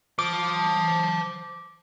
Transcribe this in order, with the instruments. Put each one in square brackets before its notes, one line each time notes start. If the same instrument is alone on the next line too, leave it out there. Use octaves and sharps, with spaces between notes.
[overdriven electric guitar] C5 A5 [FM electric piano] D6